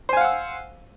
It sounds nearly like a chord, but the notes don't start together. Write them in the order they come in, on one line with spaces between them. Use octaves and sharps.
C5 G#5 F5 F#5 E6